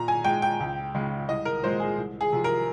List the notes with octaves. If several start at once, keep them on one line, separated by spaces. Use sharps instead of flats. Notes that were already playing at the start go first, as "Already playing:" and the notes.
Already playing: A#2 A#5
G#5
G#3 G5
G5
C#2
C#3 G#3
C2 D#5
A#4
A#2 G#3 C5
G#4
C2
G#4
C3 F3
A#4